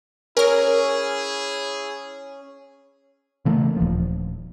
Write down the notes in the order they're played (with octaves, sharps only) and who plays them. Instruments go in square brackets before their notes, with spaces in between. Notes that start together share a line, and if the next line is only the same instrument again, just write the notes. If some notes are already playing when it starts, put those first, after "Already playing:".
[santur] C#4 [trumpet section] E4 G#4 [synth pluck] A#4 F6
[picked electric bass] C#3 E3 A3 A#3
D#1 F3